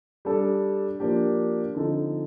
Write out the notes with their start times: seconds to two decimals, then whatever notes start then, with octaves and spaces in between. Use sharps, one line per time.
0.25 G3 D4 A4
1.00 F3 A#3 D4 G4
1.74 D3 F3 C4 D#4 A4